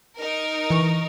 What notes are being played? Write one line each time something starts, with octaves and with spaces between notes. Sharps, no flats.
D#4 A#4
E3 C#6